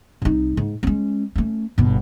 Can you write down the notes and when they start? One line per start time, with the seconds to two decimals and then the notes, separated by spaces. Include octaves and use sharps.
0.22 C2 D#4
0.57 G#2
0.83 G#3 C#4
1.36 A3 C#4
1.78 G1 B2